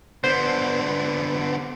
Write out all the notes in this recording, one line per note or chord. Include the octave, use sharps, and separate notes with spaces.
D3 B3 C5